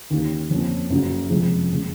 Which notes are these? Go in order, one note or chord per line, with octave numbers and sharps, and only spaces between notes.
D#2 D#3 A#3 C#4
F2 F3 A#3 C#4
F#1 F#2 C#3 F#3 B3
F1 F2 C#3 F3 G#3
F#1 C#3 G#3